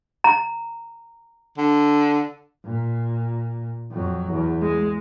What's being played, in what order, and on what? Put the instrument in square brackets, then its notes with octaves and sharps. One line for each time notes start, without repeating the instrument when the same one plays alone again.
[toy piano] A#5
[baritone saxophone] D3
[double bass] A#2
F2 F#3
E2
G#3